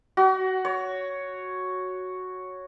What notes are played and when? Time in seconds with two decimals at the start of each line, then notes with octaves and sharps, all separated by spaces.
0.17 F#4
0.65 C#5